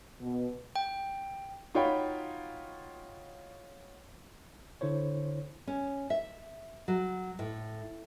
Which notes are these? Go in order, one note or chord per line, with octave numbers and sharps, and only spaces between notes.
B2
G5
D#4 F4 F#4 C#5 G5 B5
D3 E4 C5 C#5
C#4
E5
F#3
A2